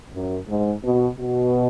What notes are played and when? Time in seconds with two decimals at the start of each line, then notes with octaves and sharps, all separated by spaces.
0.13 F#2
0.48 G#2
0.83 B2
1.18 B2